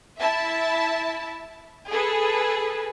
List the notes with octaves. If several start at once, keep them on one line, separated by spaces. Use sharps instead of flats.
E4 E5 A5
G#4 A4 B4